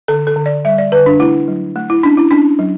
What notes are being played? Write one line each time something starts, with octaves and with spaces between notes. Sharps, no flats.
D3 A4
A4
D3
D5
G3 E5
D5
D3 B4
D4
A3 E4
F#3
A3
E4
C#4 D4
E4
C#4 D4
F#3